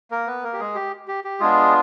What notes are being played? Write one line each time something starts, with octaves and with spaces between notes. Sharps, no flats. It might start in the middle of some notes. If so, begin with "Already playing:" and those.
A#3 A#4
B3 B4
A#3 A#4
G4
G#3 G#4
G4
G4
G4
G#3 B3 D4 F4 G#4